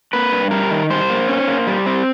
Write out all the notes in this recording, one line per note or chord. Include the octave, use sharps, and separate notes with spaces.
A#3 B4
G2
G3 A#4
D#3
G3 C5
A#3
C#4
A#3
G3
C4